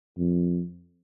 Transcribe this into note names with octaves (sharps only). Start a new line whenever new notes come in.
F2